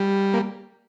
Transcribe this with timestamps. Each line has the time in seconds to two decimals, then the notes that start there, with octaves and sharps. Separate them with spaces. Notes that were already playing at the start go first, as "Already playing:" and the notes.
Already playing: G3
0.34 A#3